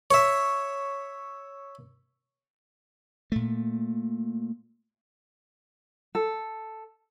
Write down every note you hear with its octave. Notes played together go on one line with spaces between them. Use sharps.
C#5 E5
A#2 A3
A4